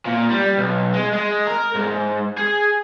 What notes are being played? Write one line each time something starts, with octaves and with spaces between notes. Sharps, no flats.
A#2
G3
B1
G#3
G#3
A#4
G#2
G#4